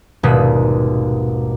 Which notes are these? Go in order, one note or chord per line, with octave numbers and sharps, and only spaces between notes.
D#1 G#1 B2 B6